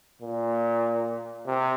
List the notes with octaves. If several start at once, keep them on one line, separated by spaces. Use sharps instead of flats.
A#2
C3